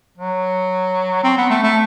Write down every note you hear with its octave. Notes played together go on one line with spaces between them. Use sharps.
F#3
C4
B3
A3
A3